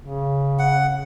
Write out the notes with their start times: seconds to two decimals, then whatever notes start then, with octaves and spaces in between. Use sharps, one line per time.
0.02 C#3
0.59 F#5